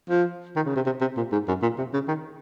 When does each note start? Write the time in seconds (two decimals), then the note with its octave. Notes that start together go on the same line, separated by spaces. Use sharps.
0.10 F3
0.56 D#3
0.66 C#3
0.76 C3
0.86 C3
1.01 C3
1.17 A#2
1.32 G#2
1.48 F#2
1.62 A#2
1.78 C3
1.94 C#3
2.08 D#3